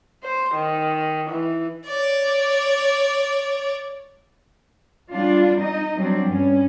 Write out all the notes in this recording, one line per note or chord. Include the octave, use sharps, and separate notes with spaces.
C5
D#3
E3
C#5 D5
G3 D4 F4
D#4 D#5
F#3 G3 C4 D4
G2 C#4